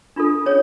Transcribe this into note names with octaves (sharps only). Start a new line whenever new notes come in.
D4 F4 A4
C#4 G#4 C#5